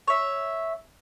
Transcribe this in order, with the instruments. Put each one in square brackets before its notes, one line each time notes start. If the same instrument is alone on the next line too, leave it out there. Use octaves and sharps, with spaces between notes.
[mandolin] C#5 E5